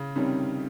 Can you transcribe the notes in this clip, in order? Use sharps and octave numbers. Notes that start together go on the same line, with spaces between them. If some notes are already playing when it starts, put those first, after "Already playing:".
Already playing: C#3
F2 C3 D#3 G3 C#4